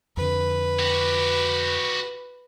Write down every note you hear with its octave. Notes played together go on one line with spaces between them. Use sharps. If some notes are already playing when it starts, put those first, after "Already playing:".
F2 D3 B4
F#4 G4